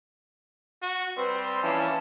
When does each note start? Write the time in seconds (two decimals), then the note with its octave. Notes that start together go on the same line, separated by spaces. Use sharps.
0.82 F#4
1.17 G3 C4 B4 C6
1.63 E3 F3 A#3 C#4 A5